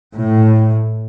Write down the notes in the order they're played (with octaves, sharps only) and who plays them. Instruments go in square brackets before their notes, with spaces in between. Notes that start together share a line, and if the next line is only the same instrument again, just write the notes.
[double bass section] A2